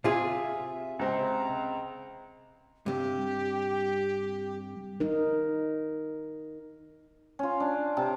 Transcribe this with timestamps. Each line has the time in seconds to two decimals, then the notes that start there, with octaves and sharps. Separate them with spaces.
0.04 C3 F4 G#4 E5
0.99 C#2 C4 A#5
2.86 G2 C3 G4
5.00 D#4 A#4
7.39 C#4 F4
7.60 D4
7.97 C3 A5 A#5